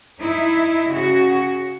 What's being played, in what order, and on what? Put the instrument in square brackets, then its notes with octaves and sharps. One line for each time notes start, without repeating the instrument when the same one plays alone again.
[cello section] D#4 E4
C#3 F#4